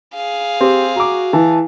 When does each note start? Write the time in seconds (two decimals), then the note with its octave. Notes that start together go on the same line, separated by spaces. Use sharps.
0.14 G#4 F5
0.61 C4 G4
0.96 F#4 A#5 D6
1.33 E3 A5